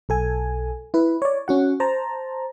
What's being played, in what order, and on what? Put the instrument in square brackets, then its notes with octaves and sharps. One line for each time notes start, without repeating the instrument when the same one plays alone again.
[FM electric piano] B1 A4 G#5
E4 B4
C#5 D5
C#4 F#4 F#5
C5 A5 A#5